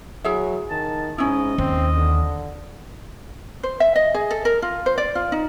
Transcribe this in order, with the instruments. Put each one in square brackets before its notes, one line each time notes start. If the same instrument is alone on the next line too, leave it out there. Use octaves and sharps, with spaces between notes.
[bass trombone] F#3 [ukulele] E4 G#4 E5
[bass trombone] D#3 [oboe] A5
[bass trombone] G#2 [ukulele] C#4 D#4 E4 [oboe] D#5
[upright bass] D#2 [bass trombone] C4
[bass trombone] D3
[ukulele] C5
E5
D#5
G#4
A4
A#4
F4
C5
D5
F4
D#4